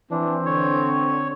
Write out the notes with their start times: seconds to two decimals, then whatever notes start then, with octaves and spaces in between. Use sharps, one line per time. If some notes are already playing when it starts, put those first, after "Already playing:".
0.11 E3 C4 D4
0.46 D3 C#5